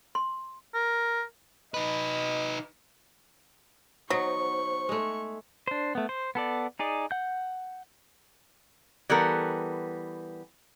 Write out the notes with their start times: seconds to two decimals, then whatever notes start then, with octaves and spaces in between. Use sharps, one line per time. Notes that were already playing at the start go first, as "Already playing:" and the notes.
0.15 C6
0.74 A#4
1.74 D#4 B4 D#5
4.10 F#3 B3 D#4 C5 C#6
4.89 G#3 A3
5.68 D4 C5
5.95 A3 B3
6.09 C5
6.35 B3 A4 D5
6.79 D#4 G#4 D5
7.11 F#5 G6
9.10 E3 G3 B3 A4 A#4